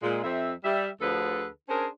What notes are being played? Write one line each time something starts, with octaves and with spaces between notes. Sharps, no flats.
A#2 G#3
F2 C4 E5
G3 E5
D2 D3 F3 G#4 A4 B4
C#4 D4 G#4 A#4 C5